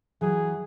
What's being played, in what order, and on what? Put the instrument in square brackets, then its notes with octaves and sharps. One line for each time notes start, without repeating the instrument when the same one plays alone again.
[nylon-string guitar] E3 F#3 [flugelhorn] G#4